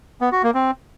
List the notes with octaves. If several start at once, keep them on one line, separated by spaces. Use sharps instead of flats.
B3
F#4
A#3
C4